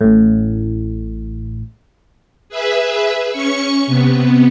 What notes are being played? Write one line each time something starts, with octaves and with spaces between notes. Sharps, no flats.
A1 A2
G#4 B4 E5
C#4 C#6 C#7
C3 B3